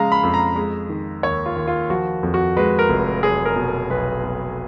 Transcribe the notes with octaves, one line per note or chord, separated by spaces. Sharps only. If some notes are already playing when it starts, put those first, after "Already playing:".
Already playing: C#3 F3 G#3 F5 A#5
B5
F2
A#5
G#3
D#3
D#2 C#5
F4
D#2
F4
F3 F#4
F2
F#4
G#3 B4
A#4
F1
F#3 G#4
A#4
B2
A#4
B1 B4
B1